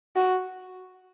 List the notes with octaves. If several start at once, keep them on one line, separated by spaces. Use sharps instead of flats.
F#4